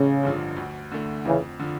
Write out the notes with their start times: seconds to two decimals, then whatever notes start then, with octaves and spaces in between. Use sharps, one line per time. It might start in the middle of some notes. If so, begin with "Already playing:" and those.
Already playing: A1 C#3
0.23 G2 D3 F3
0.57 D2
0.91 D3 A3
1.25 F2 C#3 E3
1.59 D3 F3